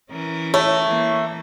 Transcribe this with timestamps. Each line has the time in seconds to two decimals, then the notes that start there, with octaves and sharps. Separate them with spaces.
0.11 E3 C#4 A#4
0.54 A3 C#5
0.86 E3 A#3